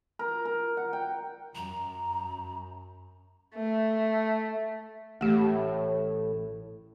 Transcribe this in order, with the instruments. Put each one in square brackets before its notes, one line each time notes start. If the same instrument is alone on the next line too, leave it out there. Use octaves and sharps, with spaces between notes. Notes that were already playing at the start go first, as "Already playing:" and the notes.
[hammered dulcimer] A#4
A#4
F#5
G5
[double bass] F#2 [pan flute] A#5
[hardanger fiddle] A3
[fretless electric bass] A1 [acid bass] A2 [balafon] A3 G4